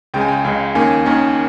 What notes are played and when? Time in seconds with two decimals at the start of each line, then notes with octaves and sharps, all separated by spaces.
0.14 C#2 C#3 G#3 G5
0.21 G#5
0.28 G5
0.44 C#2 C#3 G#3
0.75 D#2 D#3 A#3 C#4 G#5
1.06 D#2 D#3 A#3 C#4